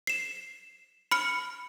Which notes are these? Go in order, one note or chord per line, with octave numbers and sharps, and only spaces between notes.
C7 E7
B5 F6 C#7